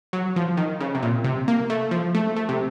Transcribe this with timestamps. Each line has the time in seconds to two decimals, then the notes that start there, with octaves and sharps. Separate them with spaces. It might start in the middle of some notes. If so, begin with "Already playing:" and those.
0.13 F#3
0.36 F3
0.57 D#3
0.80 C#3
0.95 C3
1.03 A#2
1.24 C3
1.48 A#3
1.70 A3
1.91 F3
2.15 A3
2.36 A3
2.49 C3